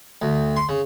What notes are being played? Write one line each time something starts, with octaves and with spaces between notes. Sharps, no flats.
D2
C6
C#3